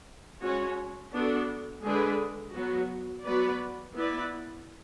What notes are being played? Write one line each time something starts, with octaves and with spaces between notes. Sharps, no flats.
G#3 C#4 F#4 C#5
B3 D4 F#4 A4
D3 G#3 D4 G#4 B4
F#3 B3 F#4
F#3 B3 F#4 B4 D5
B3 E4 B4 D5